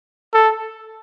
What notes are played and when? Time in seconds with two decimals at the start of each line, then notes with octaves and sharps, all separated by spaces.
0.34 A4